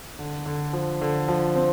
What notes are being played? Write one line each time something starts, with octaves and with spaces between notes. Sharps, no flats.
D3
D3
F3
D3
F3
C4